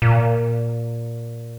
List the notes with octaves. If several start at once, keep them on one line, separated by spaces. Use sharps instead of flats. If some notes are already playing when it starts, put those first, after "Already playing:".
A#2